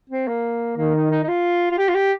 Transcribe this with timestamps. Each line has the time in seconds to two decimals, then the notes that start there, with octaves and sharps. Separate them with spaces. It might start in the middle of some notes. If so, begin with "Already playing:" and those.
0.10 C4
0.28 A#3
0.77 D#3 A#3
0.95 D#4
1.11 D#4
1.23 D#4
1.28 F4
1.71 F4
1.78 G4
1.89 F4
1.95 G4